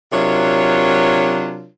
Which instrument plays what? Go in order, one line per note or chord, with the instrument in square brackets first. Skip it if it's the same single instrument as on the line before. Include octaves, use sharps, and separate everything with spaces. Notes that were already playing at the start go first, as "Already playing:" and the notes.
[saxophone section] C3 F#3 D4 F4 A#4 C#5